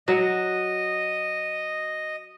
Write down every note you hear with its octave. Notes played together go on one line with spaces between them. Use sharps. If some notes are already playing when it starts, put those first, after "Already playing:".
F#3 F#4 D#5